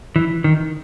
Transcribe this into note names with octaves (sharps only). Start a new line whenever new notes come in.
E3
D#3